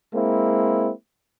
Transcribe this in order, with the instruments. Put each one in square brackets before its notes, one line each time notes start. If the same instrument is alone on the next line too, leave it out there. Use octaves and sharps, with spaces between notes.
[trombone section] G#3 A#3 C4 E4